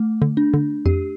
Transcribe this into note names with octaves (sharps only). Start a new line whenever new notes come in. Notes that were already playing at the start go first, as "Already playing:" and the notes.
Already playing: A3
D3
D4
D3
F2 G4